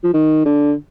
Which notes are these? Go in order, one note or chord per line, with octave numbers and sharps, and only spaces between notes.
F3
D#3
D3